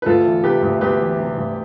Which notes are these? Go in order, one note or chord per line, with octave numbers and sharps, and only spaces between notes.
B4
D2 F4 A4
E3
C3 G4 B4
D2
D2 G4 B4
E3
C3
D2